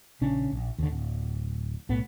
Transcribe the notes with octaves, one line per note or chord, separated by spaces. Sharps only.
A#1 C#3 C#4 D4
A#1
D#2 D3
D1
B1 A2 B3